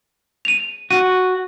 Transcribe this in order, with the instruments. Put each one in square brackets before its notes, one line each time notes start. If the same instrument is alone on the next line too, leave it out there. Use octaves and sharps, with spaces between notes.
[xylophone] D#7 F7
[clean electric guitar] F#4 [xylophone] D#7